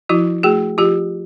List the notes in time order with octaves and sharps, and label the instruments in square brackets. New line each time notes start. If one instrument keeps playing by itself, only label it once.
[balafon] F3 E4 F#4
A3 F#4 G#4
F3 F4 G4